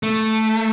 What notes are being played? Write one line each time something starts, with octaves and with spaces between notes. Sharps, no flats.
A3